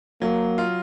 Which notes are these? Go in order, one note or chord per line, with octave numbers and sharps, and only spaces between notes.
F#3 A#3
F4